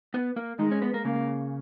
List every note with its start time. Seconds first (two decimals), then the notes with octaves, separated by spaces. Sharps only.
0.14 B3 B4
0.36 A#3 A#4
0.59 D#3 G#3 D#4
0.71 C#4 C#5
0.82 B3 B4
0.93 A#3 A#4
1.05 C#3 A#3 C#4